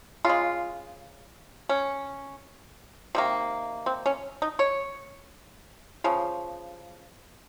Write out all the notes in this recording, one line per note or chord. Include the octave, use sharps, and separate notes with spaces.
C#3 G#3 F4
C#4
C3 D#3 A#3
C4
C#4
D#4
C#5
C#3 F3